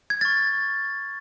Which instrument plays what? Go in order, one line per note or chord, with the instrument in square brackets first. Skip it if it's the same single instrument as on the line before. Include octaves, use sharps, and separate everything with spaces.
[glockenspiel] G#6
C#6 F6 A6